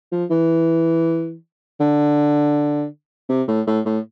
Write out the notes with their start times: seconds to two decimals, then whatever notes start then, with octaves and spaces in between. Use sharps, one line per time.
0.12 F3
0.30 E3
1.80 D3
3.29 C3
3.48 A2
3.67 A2
3.86 A2